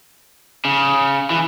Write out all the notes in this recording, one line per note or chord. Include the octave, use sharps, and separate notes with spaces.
C#3
E3